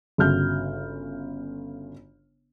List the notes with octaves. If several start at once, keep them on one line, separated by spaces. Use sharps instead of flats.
G1 C#3 F#4 F6 G6